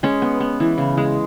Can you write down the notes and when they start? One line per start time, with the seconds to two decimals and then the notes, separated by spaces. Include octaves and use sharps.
0.03 G#3 C#4
0.22 B3
0.40 B3
0.60 E3
0.78 C#3
0.97 G#3